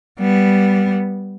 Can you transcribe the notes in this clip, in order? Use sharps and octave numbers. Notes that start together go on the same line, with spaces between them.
G3 B3